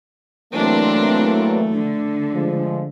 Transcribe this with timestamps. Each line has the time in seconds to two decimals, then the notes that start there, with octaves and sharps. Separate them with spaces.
0.53 E3 F#3 A3 A#3 C4 D4 A#4
1.75 D3
2.34 F3 G#3